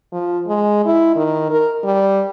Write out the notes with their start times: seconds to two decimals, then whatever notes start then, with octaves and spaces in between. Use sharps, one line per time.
0.13 F3
0.48 G#3
0.86 E4
1.16 D#3
1.51 A#4
1.84 G3